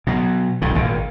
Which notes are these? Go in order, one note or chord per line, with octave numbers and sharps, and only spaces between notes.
B2 F#3
B1 G2 D#3
G#1 A#2